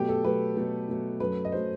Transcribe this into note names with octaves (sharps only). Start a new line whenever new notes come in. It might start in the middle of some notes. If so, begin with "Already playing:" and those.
Already playing: B2 F#3 A3 G4
A4
B2 F#3 A3 B4
B2 F#3 A3
B2 F#3 A3
F#2 F#3 A3 B4
D#5
F#3 A3 C5